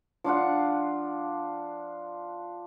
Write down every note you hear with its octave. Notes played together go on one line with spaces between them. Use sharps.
F3 D4 F4 F#5